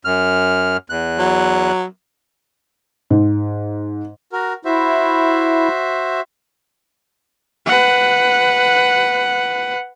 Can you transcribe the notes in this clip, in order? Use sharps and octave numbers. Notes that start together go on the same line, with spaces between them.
F#2 F6
E2 F#6
F#3
G#2
F#4 A#4
E4 F#4 C5 E5
B4 F#5